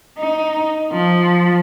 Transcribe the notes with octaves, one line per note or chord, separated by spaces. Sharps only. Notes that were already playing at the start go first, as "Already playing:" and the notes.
D#4
F3